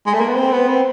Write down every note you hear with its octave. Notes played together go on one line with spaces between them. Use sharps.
G#3
A3
A#3
B3
C4
B3
C4